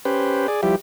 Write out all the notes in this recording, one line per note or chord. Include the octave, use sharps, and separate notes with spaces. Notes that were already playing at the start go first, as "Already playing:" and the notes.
C#4 G4 B4 C5
G#4 D5
F3 G3 E4 G4